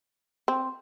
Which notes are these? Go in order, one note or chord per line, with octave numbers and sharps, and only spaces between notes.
C4